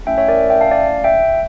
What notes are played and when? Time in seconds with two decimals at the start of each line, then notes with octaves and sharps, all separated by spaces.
0.07 A3 C#4 E4 E5 G5
0.18 C#5 E5
0.28 A#4 D5
0.50 E5 G5
0.61 F5 A5
0.71 D5 F5
1.04 E5 G5